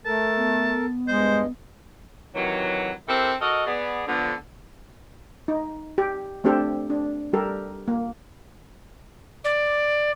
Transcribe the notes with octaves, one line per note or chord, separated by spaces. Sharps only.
A3 A4 A#4 A5
B3
G2 G#3 C5 D#5
C3 D#3 E3 F#3
C4 E4 G4 A4 A#4 C5
F#4 A4 A#4 D#5
B3 G#4 D5
D3 F3 B3
D#4
G4
A3 C4 D4 G4 A4 C5
D4
G3 G4 A4 A#4
A#3
D5